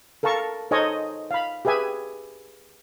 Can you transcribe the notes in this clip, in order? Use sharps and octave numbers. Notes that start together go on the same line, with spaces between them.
A4 A#4 F5 A5 C#6
D#4 A4 C5 C#5 D#5 G#5
F5 B5
G4 G#4 B4 E5 G#5